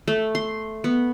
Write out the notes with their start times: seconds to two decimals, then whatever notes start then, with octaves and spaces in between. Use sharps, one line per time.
0.08 A3
0.35 C6
0.84 B3